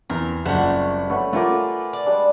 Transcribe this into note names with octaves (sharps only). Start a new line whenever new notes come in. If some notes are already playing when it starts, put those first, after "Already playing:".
E2 C4 A#4
F#1 C#2 G3 F#4 F#5
A3 B4 C#5 F#5
A3 F4 A#4 F#5 G#5 D6
D5
G3 G#3 D4